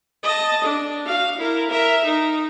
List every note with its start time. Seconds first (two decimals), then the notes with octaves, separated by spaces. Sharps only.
0.23 D#5 A5
0.64 D4
1.06 F#4 F5
1.37 E4 A#4
1.70 A#4 E5
2.05 D#4